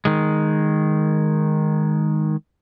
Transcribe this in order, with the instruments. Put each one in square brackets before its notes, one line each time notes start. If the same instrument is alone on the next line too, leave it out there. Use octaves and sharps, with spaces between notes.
[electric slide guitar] D#3 G#3